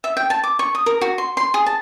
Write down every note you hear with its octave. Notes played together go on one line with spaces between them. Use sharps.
E5
G5
A5
D6
C#6
D#6
A#4
F#4
C6
C6
G#4
A5